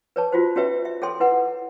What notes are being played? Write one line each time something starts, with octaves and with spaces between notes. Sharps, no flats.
B4 C#5 A5
F4 F#4 C5
C#4 F#4 G4 B4 C#5 E5
E5
G#4 A4 C#5 G5 C6
E4 B4 F#5